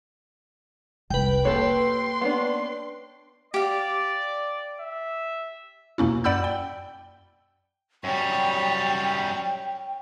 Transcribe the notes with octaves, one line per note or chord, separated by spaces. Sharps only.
F1 C2 B4 G5
A#3 G4 A4 C#5 C6
B3 C#4 D4
G4 D5 F5
E5
F2 B2 A#3 C#4 E4
F#2 D5 F#5 B5 E6 G6
G5
F#2 G3 C#5 G5